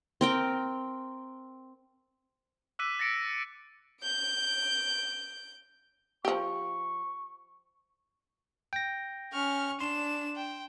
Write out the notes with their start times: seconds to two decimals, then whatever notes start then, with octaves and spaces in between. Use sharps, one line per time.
0.21 C4 A#4 G5
2.79 D6 E6 F#6 B6 D#7
2.99 A6 A#6 C#7 D7
4.03 G6 D7
6.25 F3 G4 C#6
8.73 G5 A#6
9.33 C#4 C#6 F6
9.81 D4 C6 E7
10.36 G5